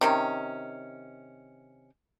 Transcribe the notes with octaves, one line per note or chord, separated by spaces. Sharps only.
C3 D#3 C#4